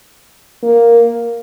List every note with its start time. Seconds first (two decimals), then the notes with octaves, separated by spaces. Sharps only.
0.63 A#3